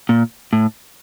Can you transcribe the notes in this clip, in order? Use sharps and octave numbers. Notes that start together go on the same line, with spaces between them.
A#2
A2